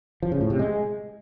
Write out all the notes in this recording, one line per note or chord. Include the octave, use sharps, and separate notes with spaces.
F3
C#3
A2
C3
G#3